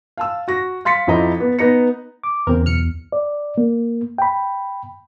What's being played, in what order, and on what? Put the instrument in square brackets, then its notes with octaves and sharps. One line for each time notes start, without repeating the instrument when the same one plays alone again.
[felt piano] F5 A5 E6
F#4 A#6
F5 C6 A6 B6 C#7
F2 F3 C4 E4 D#5 A#5
B3
B3 D#4 A#6 C#7
[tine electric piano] D6
[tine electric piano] E2 [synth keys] C#3 C4 A#4
[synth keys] B1 F6 C#7
[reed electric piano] D5
A#3
G5 B5